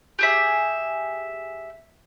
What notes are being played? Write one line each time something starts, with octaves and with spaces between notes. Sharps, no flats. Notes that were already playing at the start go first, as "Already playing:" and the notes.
G4 G#4 E5